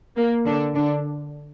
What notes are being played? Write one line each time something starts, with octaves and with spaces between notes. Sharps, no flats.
A#3
D3 D4
D3 D4